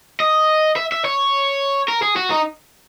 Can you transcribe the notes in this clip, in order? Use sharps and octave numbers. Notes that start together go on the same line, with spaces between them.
D#5
E5
E5
C#5
A#4
G#4
F#4
D#4